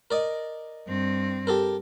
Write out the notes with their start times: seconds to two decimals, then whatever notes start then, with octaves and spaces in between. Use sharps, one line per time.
0.11 A#4 D5 D#5
0.87 G2 C4
1.47 G4 A4 A#4